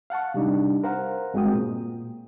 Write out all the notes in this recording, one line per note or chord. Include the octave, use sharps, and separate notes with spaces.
F5 F#5 A5 C#6
C3 G3 D4 D#4
A#4 C5 F5 F#5 A#5
G2 G#3 C4 F#4 G5 D#6
A#2